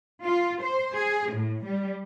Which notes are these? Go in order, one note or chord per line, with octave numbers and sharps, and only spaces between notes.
F4
C5
G#4
A2
G3